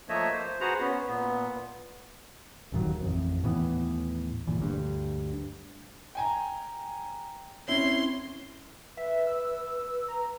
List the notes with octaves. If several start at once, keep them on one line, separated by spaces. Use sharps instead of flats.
F3 A3 A#3 C#5 D#5 E5
C5
F#4 G#4 B4 C5 F#5 A#5
B3 C#4
A#2 B3
D#1 G2 D#3 F#3
A1 F2
D#2 A2 E3 B3
G1 E2 A#2
D2 G2
G5 G#5 A#5
C4 C#4 E4 C6
B4 E5
E6
A#5